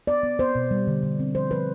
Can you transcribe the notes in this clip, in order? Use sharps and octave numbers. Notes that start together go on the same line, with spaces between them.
B3 D5
B3
B3 C5
B2
G3
D3
D3
C4
F3 C5
F3 B4